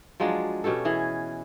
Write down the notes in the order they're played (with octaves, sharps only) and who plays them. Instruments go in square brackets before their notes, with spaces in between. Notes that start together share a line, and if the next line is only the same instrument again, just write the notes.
[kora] F3 F#3 G#3 D4
B2 C#4 G4 A4
E3 G#4